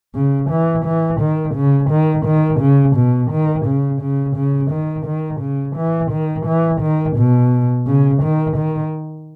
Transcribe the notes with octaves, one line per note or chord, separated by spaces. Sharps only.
C#3
E3
E3
D#3
C#3
D#3
D#3
C#3
B2
D#3
C#3
C#3
C#3
D#3
D#3
C#3
E3
D#3
E3
D#3
B2
C#3
D#3
D#3